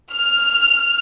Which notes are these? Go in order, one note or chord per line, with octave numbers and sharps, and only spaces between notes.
F6